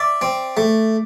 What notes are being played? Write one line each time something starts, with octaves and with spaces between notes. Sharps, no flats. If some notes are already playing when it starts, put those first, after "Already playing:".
Already playing: D5 E5
C4
A3